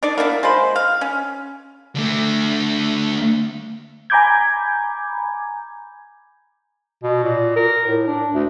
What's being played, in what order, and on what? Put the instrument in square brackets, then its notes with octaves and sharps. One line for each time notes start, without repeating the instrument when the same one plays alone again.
[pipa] D4 D#4 D5
A#3 B3 D4 E4
G#3 F4 C5 B5
F5
C#4
[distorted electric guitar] D3 A3
[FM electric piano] G#5 A#5 B5 D6 G6 G#6
[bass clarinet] B2
A#2
A#4
A2
D4
D2